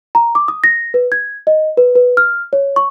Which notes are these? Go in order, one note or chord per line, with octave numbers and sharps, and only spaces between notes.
A#5
D6
D#6
A#6
B4
G#6
D#5
B4
B4
F6
C#5
C#6